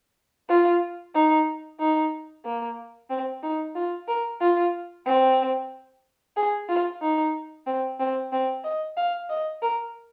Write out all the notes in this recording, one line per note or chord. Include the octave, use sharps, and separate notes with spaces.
F4
D#4
D#4
A#3
C4
D#4
F4
A#4
F4
C4
G#4
F4
D#4
C4
C4
C4
D#5
F5
D#5
A#4